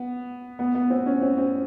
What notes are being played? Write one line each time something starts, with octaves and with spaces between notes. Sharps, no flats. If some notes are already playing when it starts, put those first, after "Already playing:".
Already playing: B3
B3
B3
C4
C#4
C4
C4